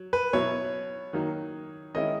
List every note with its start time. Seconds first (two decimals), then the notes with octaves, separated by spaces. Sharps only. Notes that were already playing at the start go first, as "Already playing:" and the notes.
Already playing: F#3
0.13 B4
0.33 B2 F#3 B3 E4 C#5
1.13 D#3 F#3 A#3 D#4
1.94 D#3 G#3 C#4 E4 D#5